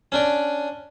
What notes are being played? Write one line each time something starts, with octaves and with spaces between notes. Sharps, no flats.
C#4 D4 D5